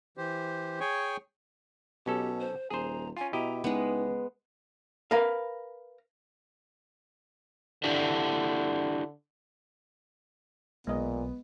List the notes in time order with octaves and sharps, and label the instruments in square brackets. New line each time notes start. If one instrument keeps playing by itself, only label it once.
[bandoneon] E3 G4 C5
G#4 C#5 G5 G#5 C#6
[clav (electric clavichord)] B1 C#4 A4 [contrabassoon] B2 [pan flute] G4
[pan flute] C5
[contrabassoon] D#1 [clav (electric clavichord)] G#4 C5 [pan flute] A#5
[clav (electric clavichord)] C#4 F4 [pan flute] G#5
[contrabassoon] B2 [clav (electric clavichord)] E4 G4 D#5 [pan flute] A#5
[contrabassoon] C#2 [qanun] G#3 B3 [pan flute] D#4
[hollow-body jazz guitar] A#4 B4 F5
[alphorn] D3 [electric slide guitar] D4 E4 G4
[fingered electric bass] B1 [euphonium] A#2 [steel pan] G#3 D#5 [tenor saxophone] B3